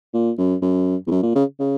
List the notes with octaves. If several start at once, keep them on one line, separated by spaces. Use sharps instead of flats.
A#2
F#2
F#2
E2
F#2
A#2
C#3
C#3